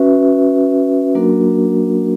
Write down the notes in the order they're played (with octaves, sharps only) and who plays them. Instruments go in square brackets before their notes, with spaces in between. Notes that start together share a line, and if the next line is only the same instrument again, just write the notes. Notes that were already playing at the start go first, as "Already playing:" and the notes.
Already playing: [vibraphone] C#4 F#4 B4 E5
F#3 A#3 D4 F#4 A#4